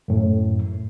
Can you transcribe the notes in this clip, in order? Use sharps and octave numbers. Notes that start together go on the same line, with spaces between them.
F#2 A2